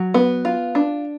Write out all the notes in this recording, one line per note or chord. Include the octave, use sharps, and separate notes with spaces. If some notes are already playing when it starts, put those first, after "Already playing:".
Already playing: F#3
B3
F4
D4